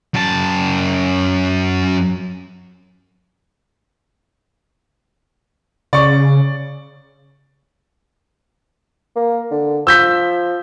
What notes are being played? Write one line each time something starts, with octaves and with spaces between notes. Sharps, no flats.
F#2 A5
C#3 D5 C#6
A#3
D3
F3 E6 G6 B6